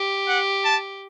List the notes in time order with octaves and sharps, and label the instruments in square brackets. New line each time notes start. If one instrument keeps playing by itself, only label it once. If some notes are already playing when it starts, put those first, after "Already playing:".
Already playing: [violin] G4
[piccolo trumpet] F#5
A5